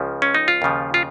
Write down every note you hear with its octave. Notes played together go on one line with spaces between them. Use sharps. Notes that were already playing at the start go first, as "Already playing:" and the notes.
Already playing: C#2 C#3 F3
C#4
D#4
F4
D#2 C#3 F3
F4